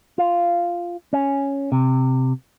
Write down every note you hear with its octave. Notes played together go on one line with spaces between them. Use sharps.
F4
C#4
C3